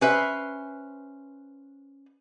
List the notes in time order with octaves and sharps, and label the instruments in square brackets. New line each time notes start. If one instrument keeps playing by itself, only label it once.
[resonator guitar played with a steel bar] C#4 B4 C5 E5